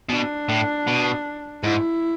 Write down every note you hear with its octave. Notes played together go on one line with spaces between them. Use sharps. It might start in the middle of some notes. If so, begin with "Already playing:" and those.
B2 D4
A2
B2
G#2 E4